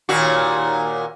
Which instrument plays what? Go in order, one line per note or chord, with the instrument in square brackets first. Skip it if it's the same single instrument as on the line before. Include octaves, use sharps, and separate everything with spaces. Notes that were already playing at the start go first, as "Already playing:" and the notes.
[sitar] D#2 A#2 F#4